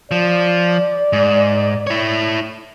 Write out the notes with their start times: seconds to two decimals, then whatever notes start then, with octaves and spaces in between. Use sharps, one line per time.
0.11 F3 D5
1.13 G#2
1.87 E4 C#5